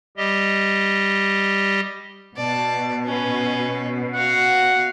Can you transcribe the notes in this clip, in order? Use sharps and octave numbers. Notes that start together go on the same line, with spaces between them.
G3 G4 D#5
B2 D5 A5
C#4 B4
F#4 F5 F#5